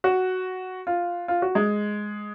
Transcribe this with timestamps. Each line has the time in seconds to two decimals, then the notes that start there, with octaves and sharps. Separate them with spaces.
0.04 F#4
0.87 F4
1.28 F4
1.42 F#4
1.55 G#3